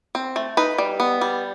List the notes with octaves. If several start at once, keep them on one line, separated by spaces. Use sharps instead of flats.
C4
A3
D#4 B4
G3
B3
G3